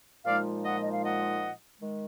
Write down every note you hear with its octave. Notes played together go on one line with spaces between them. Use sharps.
A#2 F3 G#3 D#4 D5 F5
D#5 F#5
D#5
F5
D#5 F#5
D#3 G#3